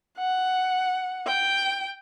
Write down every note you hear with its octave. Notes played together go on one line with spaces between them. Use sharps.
F#5
G5